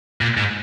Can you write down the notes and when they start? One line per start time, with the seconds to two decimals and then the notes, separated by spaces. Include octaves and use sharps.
0.21 A#2
0.37 G#2